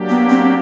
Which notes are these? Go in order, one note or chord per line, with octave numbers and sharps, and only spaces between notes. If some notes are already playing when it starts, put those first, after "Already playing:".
Already playing: F#3 A#3 D4 G4
B3
C4